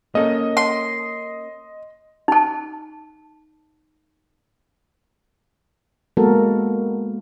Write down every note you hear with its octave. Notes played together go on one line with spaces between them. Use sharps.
A#3 C#4 A4 D#5
C6
D#4 A5
G#3 A#3 B3 F#4 A4 A#4